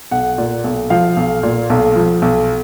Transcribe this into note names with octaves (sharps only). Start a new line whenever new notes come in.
B1 F#5
A#2
B1
F3 F5
B1
A#2
B1
F3
B1